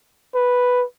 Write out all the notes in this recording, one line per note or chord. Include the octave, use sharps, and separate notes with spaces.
B4